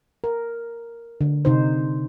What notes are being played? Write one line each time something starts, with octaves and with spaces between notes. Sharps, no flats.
A#4
D3
C3 D#4 C5